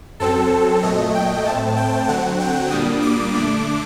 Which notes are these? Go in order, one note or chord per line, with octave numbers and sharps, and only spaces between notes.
F#2 F#3 C4 A4
A#2 F#3 A3 D#5
G5
A2 A3 C4 A5
G5
D3 F#3 C4 F#5
G5
A#2 G3 A#3 D4 D#6
D6
D3 A3 D4